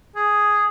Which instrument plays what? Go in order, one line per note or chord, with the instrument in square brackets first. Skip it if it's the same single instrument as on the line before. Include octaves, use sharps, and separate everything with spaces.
[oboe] G#4